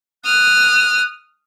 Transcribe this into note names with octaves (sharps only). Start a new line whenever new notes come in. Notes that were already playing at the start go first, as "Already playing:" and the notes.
D#6 F6 F#6